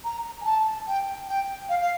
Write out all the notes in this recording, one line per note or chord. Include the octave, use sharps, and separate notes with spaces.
A#5
G#5
A5
G5
G5
F5
F5